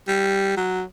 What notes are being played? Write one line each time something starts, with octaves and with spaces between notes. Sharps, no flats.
G3
F#3